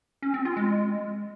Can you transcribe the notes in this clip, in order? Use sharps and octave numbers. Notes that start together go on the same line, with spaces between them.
C#4
C4
F4
G#3